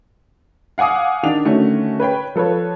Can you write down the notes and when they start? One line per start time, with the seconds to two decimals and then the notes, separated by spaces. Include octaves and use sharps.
0.78 F5 F#5 G#5 D6 D#6
1.23 D#3 D4 D5 F7
1.45 D3 D#3 A3 C#4 F#4
2.00 B4 C#5 G5 B5
2.35 F3 A4 B4 C#5